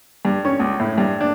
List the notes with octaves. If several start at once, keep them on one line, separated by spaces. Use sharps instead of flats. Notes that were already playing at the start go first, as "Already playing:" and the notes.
G2
C#4
C#2
A2
G2
D4